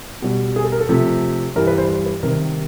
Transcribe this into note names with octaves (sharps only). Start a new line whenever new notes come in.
B2 G3
G#4
A4
A#4
A4
C3 F3 A3
G2 E3 G3 A#4
B4
C5
C5
B4
C3 D#3 G3 A#4